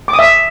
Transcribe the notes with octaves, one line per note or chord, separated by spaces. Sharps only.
D6
D#6
E5